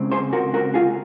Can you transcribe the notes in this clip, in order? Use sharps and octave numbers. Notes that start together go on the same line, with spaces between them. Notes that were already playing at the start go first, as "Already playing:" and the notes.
Already playing: C#3 G#3 C4
G#4 C5
F#4 A#4
F#4 A#4
F4 G#4